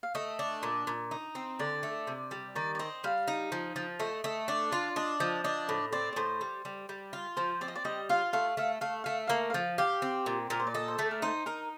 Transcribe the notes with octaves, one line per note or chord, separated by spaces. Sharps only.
F5
A3 D#5
D4
A#2
A#2
D#4
C4
D3 D5
A3
C3
G3
D#3 D5
D5
C4 D#5
G3 F5
D#4
F3
F3
A3 D#5
A3 D#5
D4 D5
F4 D5
D4 D#5
F3 D#5
D4 D#5
A2
C4 D5
D5
A2 C5
G3
G3
G3
F4
F3 C5
C4 D5
D#5
D5
G3 D#5
F4 F5
A3 F5
A3 F5
A3 F5
A3 F5
A#3 F5
F3 F5
G4 F5
C4
A#2
A#2 A#4
C5
D5
A4 D#5
C5
A3 D5
A#4
D#4 C5
D#4 A#4